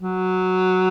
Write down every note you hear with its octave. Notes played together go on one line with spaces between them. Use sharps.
F#3